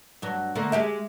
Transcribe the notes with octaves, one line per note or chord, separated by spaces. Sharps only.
G2 F#3
D3 A3 A#3
G#3 G4 E5